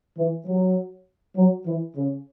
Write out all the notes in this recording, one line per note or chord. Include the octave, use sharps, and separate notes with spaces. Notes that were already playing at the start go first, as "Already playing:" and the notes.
E3
F#3
F#3
E3
C#3